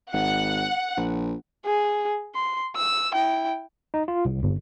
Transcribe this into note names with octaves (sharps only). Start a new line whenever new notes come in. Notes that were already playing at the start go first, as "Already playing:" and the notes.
G#1 F#5
A#1
G#4
C6
E6
E4 G5
D#4
F4
C2
G1